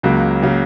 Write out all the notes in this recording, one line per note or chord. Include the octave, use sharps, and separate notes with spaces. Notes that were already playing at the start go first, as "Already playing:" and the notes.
C#2 C#3 F#3 A#3
C#3 F#3 A#3